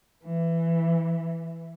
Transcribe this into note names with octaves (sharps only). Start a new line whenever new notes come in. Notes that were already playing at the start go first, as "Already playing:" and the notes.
E3